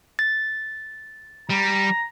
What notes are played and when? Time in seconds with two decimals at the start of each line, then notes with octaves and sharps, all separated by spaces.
0.19 A6
1.49 G3 A#5